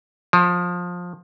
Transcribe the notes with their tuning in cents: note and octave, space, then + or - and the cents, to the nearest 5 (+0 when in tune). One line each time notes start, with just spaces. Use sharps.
F3 +20